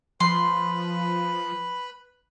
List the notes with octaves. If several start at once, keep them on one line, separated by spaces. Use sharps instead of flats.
F3 B4 B5 C6